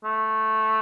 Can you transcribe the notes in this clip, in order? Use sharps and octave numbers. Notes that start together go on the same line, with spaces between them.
A3